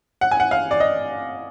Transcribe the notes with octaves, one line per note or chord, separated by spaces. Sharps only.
F#5
G#5
F#5
F5
D5
D#5